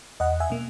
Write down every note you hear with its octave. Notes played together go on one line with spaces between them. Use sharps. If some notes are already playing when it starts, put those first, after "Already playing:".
E2 D#5 F#5
E5 G#5
B2 A#3